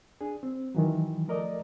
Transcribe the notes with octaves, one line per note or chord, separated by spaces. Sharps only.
D4 G#4
C4
D#3 E3 F#3
F3 A3 A#4 D5 D#5